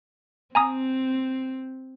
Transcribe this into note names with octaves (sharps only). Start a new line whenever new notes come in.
C4 G#5 A#5 D#6